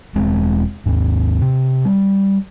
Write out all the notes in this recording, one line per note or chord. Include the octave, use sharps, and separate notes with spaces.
E1 G#3 C4
D#2 G#2
C3
G3